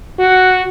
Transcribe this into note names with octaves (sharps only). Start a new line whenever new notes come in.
F#4